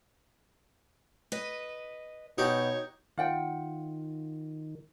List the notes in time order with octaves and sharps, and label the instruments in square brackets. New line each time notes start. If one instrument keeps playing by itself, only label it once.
[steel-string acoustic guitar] B4 D#5
[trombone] B2 [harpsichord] D#4 F#4 G4 [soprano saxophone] C#5
[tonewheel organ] D#3 [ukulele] F4 F#5 G5